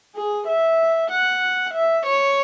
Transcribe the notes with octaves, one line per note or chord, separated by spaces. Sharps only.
G#4
E5
F#5
E5
C#5